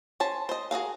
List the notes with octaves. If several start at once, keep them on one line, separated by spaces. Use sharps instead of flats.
C#4 C5 A5
C5 D#5
F#4 G#4 A#4 F5